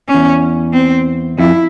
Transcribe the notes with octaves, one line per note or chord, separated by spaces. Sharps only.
C#4
E2
C4
F2 E4